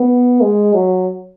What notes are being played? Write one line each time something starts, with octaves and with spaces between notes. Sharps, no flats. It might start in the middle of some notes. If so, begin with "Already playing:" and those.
Already playing: B3
G#3
F#3